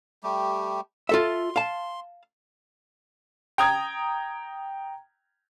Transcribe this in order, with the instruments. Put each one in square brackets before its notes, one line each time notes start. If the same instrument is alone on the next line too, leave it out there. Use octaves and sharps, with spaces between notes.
[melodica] G3 A3 G4
[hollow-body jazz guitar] F4 A4 E5 [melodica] C6
[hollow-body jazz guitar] F5 A5
[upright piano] G5 A#5 D#6 G#6